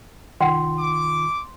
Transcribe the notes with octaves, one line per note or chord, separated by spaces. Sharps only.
C2 D#3 F4 F#5 G5 C6
D6